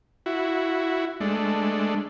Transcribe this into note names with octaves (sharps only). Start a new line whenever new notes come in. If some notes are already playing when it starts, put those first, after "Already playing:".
E4 F#4
G#3 A3 D4